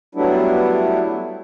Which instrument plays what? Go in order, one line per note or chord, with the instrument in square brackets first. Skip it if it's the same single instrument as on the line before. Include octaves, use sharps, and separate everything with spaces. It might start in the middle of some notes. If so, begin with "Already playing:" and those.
[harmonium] F#3 G3 A3 B3 D4 E4